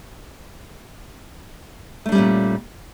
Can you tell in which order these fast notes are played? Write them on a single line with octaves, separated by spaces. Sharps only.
A3 D4 G3 C#4 A#2